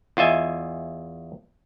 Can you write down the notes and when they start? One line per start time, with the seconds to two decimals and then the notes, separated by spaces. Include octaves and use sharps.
0.17 E2 F4 D#5 E5 G#5